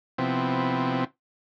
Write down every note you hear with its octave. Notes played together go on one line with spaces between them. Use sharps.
C3 F3 B3 C4 E4